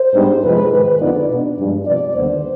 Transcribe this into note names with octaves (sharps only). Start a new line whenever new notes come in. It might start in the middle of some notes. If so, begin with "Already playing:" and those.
Already playing: C5
G#2 G3 B3 D4
F2 C3 F3 G#3 B4
G#2 D#3 G#3 B4
F2 D3 F3 B3 D#4 D5
B2 B3 D4
G2 F3 G#3
C3 F3 B3 D5
D#2 D3 G3 B3 C5